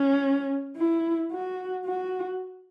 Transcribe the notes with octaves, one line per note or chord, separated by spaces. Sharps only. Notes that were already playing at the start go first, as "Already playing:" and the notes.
Already playing: C#4
E4
F#4
F#4